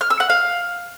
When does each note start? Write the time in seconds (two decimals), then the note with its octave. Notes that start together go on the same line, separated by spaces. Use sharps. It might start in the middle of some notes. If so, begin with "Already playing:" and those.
0.01 F6
0.10 E6
0.20 F#5
0.30 F5